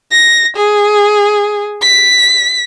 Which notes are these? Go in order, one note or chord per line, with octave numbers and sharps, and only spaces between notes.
A#6
G#4
B6